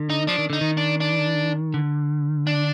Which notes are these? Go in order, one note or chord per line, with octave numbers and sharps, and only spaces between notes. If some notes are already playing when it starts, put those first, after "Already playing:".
Already playing: D3
D#4
F3 D4
D#3
D3 D#4
D#3
D4
D4
D3
D4